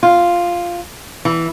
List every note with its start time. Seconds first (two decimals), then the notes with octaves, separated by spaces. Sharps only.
0.03 F4
1.25 E3